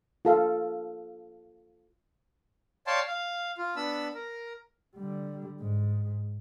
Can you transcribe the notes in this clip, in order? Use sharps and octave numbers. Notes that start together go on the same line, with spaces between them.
F4 A4 F5
C#5 D5 F5 G5 A5 C6
F5
F4
B3 D4 B5 E6
A#4
D3 G3
G#2